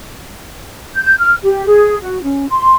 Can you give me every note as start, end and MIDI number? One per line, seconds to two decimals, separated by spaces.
0.94 1.15 91
1.20 1.34 89
1.43 1.66 67
1.67 1.98 68
2.01 2.22 66
2.23 2.48 61
2.49 2.76 84